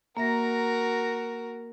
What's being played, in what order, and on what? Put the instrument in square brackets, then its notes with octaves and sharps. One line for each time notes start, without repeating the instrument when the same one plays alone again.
[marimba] A#3 E5 A#6 [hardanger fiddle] F#4 A#4